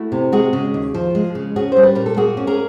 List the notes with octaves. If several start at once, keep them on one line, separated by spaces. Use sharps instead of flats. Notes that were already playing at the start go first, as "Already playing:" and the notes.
Already playing: A3 E4 F#4
C3
G#3 F#4 G#4
C#3
D#2
F3
G#3
C#3
C#4 F#4 G#4
G3 C5
B4
A#2 A#4
A4
A#3 F#4 G#4
C#4
G#4 A#4